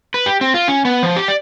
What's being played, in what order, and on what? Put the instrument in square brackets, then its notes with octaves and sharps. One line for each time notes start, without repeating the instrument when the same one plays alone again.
[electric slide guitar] B4
G4
C4
F4
C#4
B3
F3
G4
D5